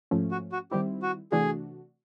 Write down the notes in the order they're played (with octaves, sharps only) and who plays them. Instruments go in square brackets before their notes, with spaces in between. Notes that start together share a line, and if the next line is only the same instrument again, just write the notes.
[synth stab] G#2 F3 A3 C#4
[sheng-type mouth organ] F#4
F#4
[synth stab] D#3 G3 C4 E4 [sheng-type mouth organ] G4
[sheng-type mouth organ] F#4
[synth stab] C3 E3 A3 D4 F#4 [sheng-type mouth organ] G#4